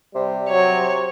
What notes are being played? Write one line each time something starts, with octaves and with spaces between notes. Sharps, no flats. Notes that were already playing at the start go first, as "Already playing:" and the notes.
C3 G3
F#3 C#5